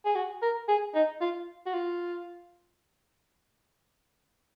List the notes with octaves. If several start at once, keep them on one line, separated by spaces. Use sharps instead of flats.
G#4
F#4
A#4
G#4
D#4
F4
F#4
F4